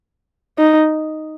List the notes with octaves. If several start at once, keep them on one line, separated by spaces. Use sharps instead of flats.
D#4